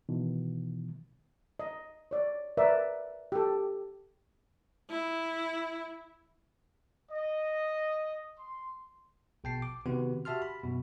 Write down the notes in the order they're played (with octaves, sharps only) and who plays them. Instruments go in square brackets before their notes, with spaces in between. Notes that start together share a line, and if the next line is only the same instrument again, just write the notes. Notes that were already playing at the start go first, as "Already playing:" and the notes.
[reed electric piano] B2 D#3 E3
[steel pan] D#5
C#5 D5
A#4 B4 D5 E5
G4 A4
[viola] E4
[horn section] D#5
C6
[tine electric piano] A#1 B2 G5 A5 C7
D6
C3 D#3 B3 F#4 B4
F#4 G4 E5 A5 C6 F6
B5
F#2 B2